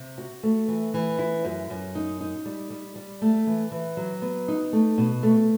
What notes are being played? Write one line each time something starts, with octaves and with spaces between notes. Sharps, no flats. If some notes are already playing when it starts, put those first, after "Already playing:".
Already playing: C3
F#4
A3
E3
E3
E4
F#2
F#2
D#4
D#4
G3
G3
G3
A3
E3
E3
F#3
B3
D#4
A3
B2
A3